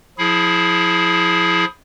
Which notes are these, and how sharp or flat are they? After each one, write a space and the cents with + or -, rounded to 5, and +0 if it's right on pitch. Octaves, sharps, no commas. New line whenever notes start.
F3 +15 E4 +0 G#4 +20